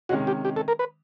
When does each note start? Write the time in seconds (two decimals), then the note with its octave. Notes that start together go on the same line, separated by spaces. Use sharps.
0.09 C3 D#3 G#3 C#4 F#4
0.27 G4
0.45 G4
0.56 A4
0.68 A#4
0.79 B4